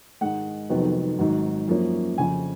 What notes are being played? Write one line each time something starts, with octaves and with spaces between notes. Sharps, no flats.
G#2 D#3 G#3 F#5
F1 F2 D#3 F#3 B3
G#1 G#2 F#3
F#2 F3 A#3 C#4
F2 C#3 F3 G#5